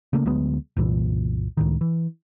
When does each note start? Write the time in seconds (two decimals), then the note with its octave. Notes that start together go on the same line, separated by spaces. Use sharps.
0.13 C#3 A3 A#3
0.26 D2 F#3 G#3 B3
0.76 F#1 C2 A#2 E3
1.57 C#2 A2 D#3
1.81 E3